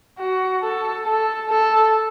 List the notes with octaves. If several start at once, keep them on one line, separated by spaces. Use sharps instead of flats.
F#4
A4
A4
A4